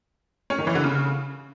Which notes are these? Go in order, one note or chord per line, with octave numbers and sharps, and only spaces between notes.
C#4
D#3
E3
D3
C#3